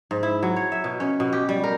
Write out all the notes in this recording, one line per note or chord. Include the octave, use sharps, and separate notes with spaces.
G#2
E4
F#3
C#5
E5
B2
C#4
B2
G4
G3
A#4